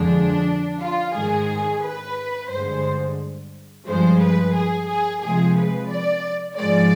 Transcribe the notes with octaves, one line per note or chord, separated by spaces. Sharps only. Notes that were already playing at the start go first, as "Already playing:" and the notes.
Already playing: F2 D3 F3 G#3 D4
F4
G#2 D#3 G#3 G#4
B4
G2 D3 G#3 C5
G2 F3 G#3 C5
B4
G#4
G#4
C3 F3 G#3 G#4
B4
D5
G#2 F3 G#3 D5